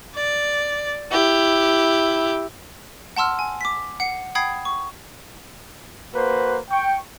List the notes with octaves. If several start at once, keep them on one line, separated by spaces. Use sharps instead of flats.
D5
E4 G4
F#5 A5 C6 E6 F6
G#5
D6 B6
F#5 C7 C#7
F#5 G5 B5 D#6 G#6 C7
C#6
A#3 F#4 B4 C5
G5 C#6